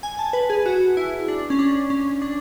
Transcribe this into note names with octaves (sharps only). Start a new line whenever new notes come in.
G#5
A5
B4
G#4
F#4
E4
D4
C#4
D4
C#4
D4